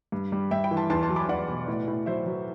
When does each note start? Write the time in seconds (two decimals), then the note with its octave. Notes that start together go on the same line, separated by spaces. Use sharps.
0.12 G2
0.32 G3
0.51 G2 E5 G5
0.64 G5 B5
0.71 E3
0.77 A5 C6
0.90 E2 A5 C6
1.03 A5 C6
1.09 F#3
1.16 B5 D6
1.28 E2 D5 F#5
1.49 B2
1.68 A2
1.87 A2
2.06 F#3 C5 E5
2.26 F#3